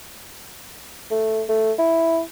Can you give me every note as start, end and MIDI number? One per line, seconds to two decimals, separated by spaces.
1.11 1.43 57
1.49 1.72 57
1.79 2.22 64